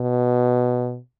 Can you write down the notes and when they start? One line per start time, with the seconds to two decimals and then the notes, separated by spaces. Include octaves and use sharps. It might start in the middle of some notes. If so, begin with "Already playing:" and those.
Already playing: B2